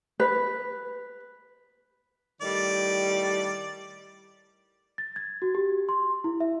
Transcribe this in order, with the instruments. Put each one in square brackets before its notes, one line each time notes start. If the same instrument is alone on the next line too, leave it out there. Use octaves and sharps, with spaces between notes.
[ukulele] B4
[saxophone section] A2 D#3 G3 [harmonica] D5
[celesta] A6
G#6
F#4
G4
C6
E4
E5